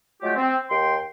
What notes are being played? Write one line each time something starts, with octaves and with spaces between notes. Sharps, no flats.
F#3 G#3 A3 F4 G4
C4
D#2 G5 C6